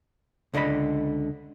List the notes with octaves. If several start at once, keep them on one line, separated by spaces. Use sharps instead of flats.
C#2 D3 D5 D#5 B5